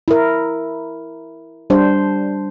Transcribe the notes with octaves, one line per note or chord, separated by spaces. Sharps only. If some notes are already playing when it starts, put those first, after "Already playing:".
E4 A#4
G3 D4 C5